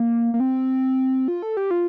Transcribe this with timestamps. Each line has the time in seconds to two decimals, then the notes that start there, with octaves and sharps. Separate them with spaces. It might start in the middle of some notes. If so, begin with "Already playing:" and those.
Already playing: A#3
0.34 A#3
0.40 C4
1.28 F4
1.42 A4
1.57 G4
1.71 F4